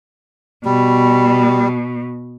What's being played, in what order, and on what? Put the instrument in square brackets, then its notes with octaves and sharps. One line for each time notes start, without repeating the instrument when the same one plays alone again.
[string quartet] B2 [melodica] G3